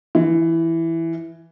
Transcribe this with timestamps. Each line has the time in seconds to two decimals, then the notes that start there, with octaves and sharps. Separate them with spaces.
0.15 E3